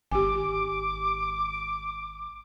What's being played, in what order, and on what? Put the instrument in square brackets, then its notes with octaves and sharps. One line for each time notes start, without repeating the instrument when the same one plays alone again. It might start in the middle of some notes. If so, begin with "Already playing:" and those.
[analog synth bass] G#1 [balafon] G4 G#5 [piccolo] D6